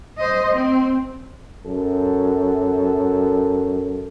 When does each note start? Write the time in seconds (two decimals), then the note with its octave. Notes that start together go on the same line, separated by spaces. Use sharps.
0.18 C5 D#5
0.54 C4
1.66 F#2 A4